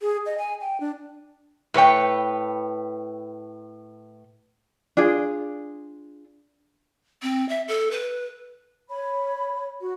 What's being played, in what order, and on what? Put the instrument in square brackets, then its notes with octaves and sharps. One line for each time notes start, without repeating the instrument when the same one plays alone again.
[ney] G#4
D#5
G#5
G5
D4
[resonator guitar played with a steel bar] A2 B4 C#5 G5
[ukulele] D4 F4 G#4
[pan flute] C4
E5
A4
B4
[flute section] C#5 B5
F#4